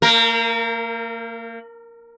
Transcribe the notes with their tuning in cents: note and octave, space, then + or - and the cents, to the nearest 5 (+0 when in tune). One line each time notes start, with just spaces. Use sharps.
A#3 -35 A#4 +0